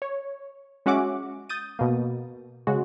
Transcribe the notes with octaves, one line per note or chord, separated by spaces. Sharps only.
C#5
G#3 C#4 F#4 E5 F#5 D6
D#6 G6 A6 D#7
B2 A#3
C#3 G#3 F#4